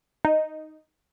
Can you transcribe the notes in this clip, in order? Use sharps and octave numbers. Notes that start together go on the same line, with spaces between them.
D#4